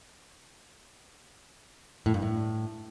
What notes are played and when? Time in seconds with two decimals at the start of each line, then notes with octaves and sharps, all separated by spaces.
2.06 A2
2.14 G2
2.22 A2